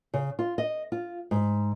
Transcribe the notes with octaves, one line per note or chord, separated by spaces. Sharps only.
C#3
F4
D#5
F4
G#2